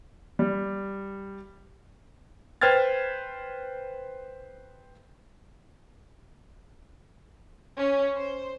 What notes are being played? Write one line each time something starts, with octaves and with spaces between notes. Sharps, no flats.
G3
B4 C5 G5 F6 G#6 A6
C#4
C5